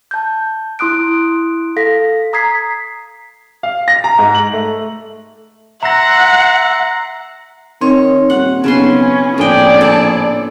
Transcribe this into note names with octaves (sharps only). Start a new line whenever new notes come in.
A5 G6
E4 C6 D#6 F#6 D7
A4 F5 A#6 B6
A#5 D#6 G#6 B6 C7
F5
A#6
A#5
G#2
F#7
A3
E5 F#5 A#5 C6 A#6
D#3 C4 C#5
D#1 F#5
B1 C#3 B3 C#4 C6
A#1 A2 G#4 D5 G5
A4